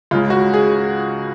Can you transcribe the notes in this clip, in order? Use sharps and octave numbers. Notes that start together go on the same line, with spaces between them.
C#2 C#3 G#3 F4
F#4
G#4